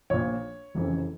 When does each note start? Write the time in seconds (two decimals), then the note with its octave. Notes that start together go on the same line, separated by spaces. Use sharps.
0.10 A#1 A#2 C#5
0.75 F1 F2 C#3 E3